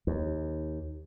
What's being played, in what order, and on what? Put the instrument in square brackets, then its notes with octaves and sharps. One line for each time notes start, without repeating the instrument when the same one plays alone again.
[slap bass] D#2